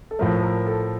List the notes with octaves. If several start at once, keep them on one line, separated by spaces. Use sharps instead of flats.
A4
A2 F3 A3 A#4
A#4
A4